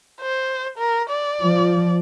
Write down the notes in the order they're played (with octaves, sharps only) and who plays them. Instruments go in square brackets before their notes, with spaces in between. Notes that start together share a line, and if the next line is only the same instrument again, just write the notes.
[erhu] C5
A#4
D5
[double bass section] F3